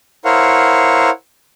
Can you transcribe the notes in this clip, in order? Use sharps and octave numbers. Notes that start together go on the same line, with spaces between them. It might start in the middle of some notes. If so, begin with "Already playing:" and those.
E4 A#4 C5 C#5 F5 F#5